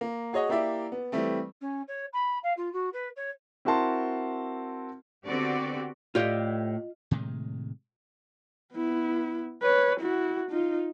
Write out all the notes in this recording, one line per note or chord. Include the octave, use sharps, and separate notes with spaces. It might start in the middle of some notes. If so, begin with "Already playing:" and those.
A#3
F#4 G#4 C#5 D#5 F#5
A#3 E4 G4 D5 E5
B3
E3 G3 A3 C4
C#4
C#5
B5
F5
F4
F#4
B4
C#5
C4 E4 F#4 A#4 A5 C6
D3 B3 C4 F#4 G4 D5
A2 F4 G4 D5 D#5
A2 C3 D#3 G#3
B3 E4
B4 C#5
E4 F#4
D#4 F4